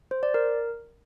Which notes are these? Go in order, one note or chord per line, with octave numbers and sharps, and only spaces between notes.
C5
D5
A#4